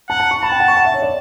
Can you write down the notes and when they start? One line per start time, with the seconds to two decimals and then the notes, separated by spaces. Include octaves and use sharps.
0.09 F#5 A5
0.20 A5
0.31 C#6
0.43 A5 B5
0.52 G5
0.60 F#5
0.68 C#6
0.77 F#5
0.85 E5
0.94 C#5
1.02 D5